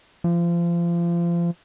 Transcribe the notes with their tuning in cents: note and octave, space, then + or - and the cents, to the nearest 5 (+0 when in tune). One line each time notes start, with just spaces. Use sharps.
F3 -30